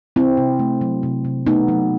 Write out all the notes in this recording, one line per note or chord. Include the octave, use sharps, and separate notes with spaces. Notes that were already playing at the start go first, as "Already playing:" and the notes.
C3 C4 E4
C3
A3
F#3
C3
C3
A3 B3 D#4
F#3